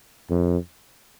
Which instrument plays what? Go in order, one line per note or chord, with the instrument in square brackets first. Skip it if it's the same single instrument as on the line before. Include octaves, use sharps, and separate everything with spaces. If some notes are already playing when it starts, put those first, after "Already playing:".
[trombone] F2